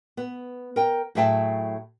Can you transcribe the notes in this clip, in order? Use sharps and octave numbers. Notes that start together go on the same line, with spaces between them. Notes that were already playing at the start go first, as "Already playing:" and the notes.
B3
A#4 G5
A2 F#3 G#4 E5 G5 A5